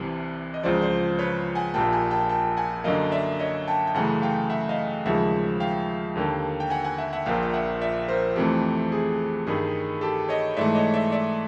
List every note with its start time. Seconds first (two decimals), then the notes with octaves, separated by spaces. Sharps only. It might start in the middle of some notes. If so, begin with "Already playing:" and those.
Already playing: C2 C3 E3 G3
0.54 D#5
0.63 C#2 C#3 F3 C5 D5
0.82 C5 D5
1.19 B4 C#5
1.55 F#5 G#5
1.74 A#1 A#2 G3 A#3 G5 A5
1.92 F#5 G#5
2.11 G5 A5
2.29 G5 A5
2.57 F#5 G#5
2.84 F#2 D3 F#3 A#3 D#5 F5
3.12 D5 E5
3.39 C#5 D#5
3.68 G5 A5
3.87 G5
3.95 F#2 C#3 E3 A3 F#5 G#5
4.22 F5 G5
4.50 E5 F#5
4.69 D#5 F5
5.06 D#2 C#3 F3 G#3 E5 F#5
5.60 F5 G5
6.15 D#2 D3 G3 A#3
6.60 G5
6.70 F#5 G#5
6.84 F#5 G#5
6.98 E5 F#5
7.13 E5 F#5
7.26 A#1 A#2 F3 A#3 F5 G5
7.43 G5
7.54 E5 F#5
7.81 D5 E5
8.08 A#4 C5
8.36 F2 C3 E3 A3 G4
8.92 G#4
9.47 G2 D#3 G3 G#4
10.01 G4 A4
10.29 C#5 D#5
10.57 G#2 E3 A3 D5 E5
10.75 C#5 D#5
10.94 D5 E5
11.12 D5 E5